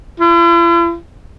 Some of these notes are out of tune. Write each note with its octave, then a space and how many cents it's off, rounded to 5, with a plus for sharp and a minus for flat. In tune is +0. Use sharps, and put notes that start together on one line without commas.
E4 +45